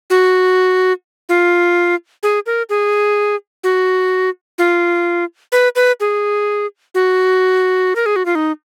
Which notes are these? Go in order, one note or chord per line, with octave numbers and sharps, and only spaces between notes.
F#4
F4
G#4
A#4
G#4
F#4
F4
B4
B4
G#4
F#4
A#4
G#4
F#4
F4
D#4